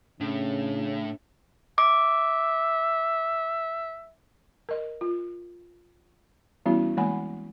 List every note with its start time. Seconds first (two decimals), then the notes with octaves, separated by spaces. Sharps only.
0.20 A2 C#3 C#4 D4
1.78 E5 D6
4.69 A#4 D#5
5.01 F4
6.66 E3 G3 B3 C#4 E4 F#4
6.97 E3 G#3 A#3 F#5 G#5 B5